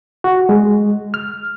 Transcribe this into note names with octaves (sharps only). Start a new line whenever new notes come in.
F#4
G#3
F6